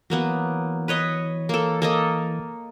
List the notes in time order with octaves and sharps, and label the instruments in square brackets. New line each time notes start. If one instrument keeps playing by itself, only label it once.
[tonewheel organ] E3 [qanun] F#3 A#3 B3
[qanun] B4 C#5 D#5
A#3 A4
A#3 A4 D#5